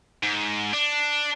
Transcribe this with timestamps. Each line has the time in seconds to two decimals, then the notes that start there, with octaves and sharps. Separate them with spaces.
0.23 G#2
0.74 D4